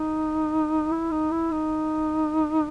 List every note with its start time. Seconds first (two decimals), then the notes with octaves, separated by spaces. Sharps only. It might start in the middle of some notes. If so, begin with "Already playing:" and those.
Already playing: D#4
0.91 E4
1.11 D#4
1.31 E4
1.51 D#4